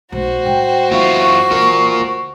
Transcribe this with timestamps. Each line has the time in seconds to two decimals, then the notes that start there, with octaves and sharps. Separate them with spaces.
0.12 B1 A3 F#4 C5
0.45 A2 G3 G5
0.91 F#2 A3 B3 E4 F4 C#6
1.51 C#2 E3 F4 A#4
2.00 D2